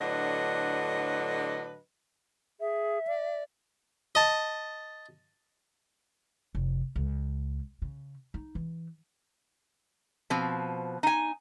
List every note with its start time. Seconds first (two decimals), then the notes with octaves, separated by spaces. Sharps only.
0.01 A2 D3 F#3 D4 B4 D#5
2.60 G#4 E5
3.07 D5
4.15 D#5 A5
6.55 F1
6.96 C#2
7.82 C#3
8.34 D#4
8.55 E3
10.30 B2 F3 C4
11.03 D#4 G#5